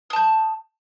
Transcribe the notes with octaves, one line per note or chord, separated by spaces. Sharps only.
A5 D#6 G6